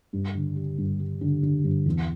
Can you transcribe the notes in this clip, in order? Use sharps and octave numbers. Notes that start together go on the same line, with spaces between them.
G2
D3
G3
G2
G3
D3
D3
G2
E2